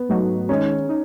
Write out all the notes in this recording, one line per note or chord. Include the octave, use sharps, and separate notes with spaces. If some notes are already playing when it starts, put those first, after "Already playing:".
Already playing: B3
G#2 F#3 A3 D#4 F#4
D#3 G#3 C#4 D#4
D#4